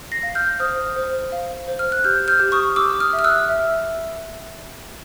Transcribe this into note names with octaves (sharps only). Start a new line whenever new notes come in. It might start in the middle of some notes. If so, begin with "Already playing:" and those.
A#6 C7
F5
F6 G6
C5 D#6 F6
C5
F5
C5
F6
F#6
G4 F6 G6
F6 G6
G4
C#6 D#6
G4 D6 E6
D#6 F6
E5
F6
E6 F#6
E5